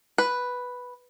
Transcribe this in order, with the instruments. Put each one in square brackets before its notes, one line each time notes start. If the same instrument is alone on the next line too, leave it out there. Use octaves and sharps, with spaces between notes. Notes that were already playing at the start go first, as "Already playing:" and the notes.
[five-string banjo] B4